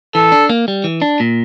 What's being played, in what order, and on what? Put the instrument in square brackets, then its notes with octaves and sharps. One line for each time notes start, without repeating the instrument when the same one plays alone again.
[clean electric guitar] E3 [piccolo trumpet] A4
[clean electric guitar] D4
A#3
G3
E3
D4
A#2